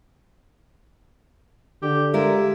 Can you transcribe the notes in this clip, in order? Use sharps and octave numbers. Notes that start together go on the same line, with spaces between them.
D3 G4
G#3 F4 G4 A#4 E5